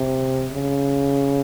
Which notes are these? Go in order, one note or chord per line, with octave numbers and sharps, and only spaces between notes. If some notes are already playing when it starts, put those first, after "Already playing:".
Already playing: C3
C#3